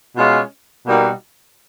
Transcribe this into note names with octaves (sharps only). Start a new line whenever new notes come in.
B2 G#3 C#4 F4
B2 G3 A#3 D#4 F#4